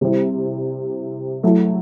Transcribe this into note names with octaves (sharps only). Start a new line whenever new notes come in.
C3 G3 C4 E4
F#3 A3 E4